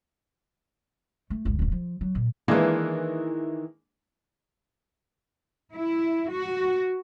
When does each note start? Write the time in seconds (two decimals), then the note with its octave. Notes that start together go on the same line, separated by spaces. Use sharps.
1.30 A3
1.45 G#1 D2
1.59 D1 F#2
1.72 F3
2.01 F#3
2.15 A#2
2.48 D#3 E3 G#3 A#3 D4
5.76 E4
6.31 F#4